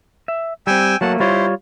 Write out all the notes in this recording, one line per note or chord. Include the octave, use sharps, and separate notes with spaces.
E5
G3 C4 G5 G#5 E6
F#3 A3 A#3 F#5 A5
G3 E4 F4 C5 C#5